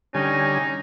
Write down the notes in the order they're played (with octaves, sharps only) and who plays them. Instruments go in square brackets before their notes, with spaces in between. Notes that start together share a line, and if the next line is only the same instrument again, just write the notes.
[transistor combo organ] D3 G3 G#5 [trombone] C#4 [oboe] D#4